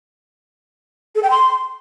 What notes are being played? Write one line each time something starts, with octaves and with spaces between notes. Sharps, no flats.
A4
G5
C6